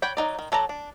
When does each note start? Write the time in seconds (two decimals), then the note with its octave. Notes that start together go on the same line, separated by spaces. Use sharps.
0.02 C#5 D5 F#5 G5 B5
0.17 F#3 D#4 D5
0.39 D#3
0.52 F#3 A4 D5 A#5
0.69 D4